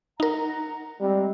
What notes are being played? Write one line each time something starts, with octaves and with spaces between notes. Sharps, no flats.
D#4 A#4 F#5 A#5
G3 G#3 C4